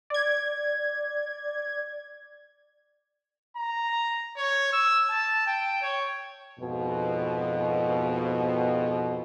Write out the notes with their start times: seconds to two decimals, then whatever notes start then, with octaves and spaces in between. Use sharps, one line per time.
0.10 D5 G#6
3.57 A#5
4.37 C#5
4.73 E6
5.10 A5
5.46 G5
5.82 C#5
6.60 F2 G#2 B2